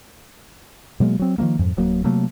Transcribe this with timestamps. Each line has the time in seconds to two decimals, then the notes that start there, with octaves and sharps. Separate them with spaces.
1.00 B2 F#3 G#3 A#3
1.19 F#3 C4
1.38 D#3 F3 A3 A#3
1.59 F2 G#2
1.77 D1 F#3 A#3
2.04 C3 F#3 A3 A#3